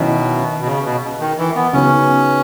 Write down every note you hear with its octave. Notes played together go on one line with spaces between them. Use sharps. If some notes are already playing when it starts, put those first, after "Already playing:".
Already playing: B2 D#3 F#3 C#4 E4
B2
C#3
B2
D#3
E3
B3
C#3 F#3 B3 C#4 D#4